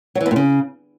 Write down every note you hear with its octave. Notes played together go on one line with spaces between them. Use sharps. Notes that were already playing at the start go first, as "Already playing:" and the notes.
F#3
E3
E2
A#2
C#3